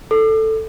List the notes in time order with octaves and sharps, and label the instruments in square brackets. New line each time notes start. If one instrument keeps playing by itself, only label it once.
[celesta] A4